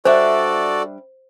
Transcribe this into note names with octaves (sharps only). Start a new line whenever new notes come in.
G3 D4 F#4 A4 C5 D5 E5